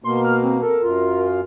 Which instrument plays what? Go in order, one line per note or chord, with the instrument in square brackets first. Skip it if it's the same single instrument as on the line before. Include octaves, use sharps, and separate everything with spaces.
[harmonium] B2 A#3 [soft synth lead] C6
[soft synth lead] F6
C4
[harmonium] A4 [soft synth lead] A#4
[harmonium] F#2 F4